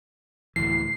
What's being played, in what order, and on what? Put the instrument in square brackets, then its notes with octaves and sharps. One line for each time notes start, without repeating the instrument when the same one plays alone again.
[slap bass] D2 A2 E3 [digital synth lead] C7